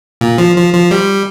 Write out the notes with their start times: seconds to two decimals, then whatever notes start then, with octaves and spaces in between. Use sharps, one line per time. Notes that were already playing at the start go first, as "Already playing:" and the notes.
0.21 A#2
0.38 F3
0.56 F3
0.74 F3
0.91 G3